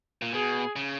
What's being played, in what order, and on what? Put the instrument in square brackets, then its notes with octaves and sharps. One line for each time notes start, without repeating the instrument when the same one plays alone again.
[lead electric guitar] A#2
[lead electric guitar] B2 [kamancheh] G#4
[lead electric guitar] C#3